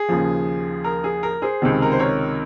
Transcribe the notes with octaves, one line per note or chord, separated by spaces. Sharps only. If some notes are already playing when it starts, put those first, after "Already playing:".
Already playing: G#4
D#2 C#3 F3
A#4
G#4
A#4
G#4 C5
C#2 C3 D#3
A#4
C5
A#4 C#5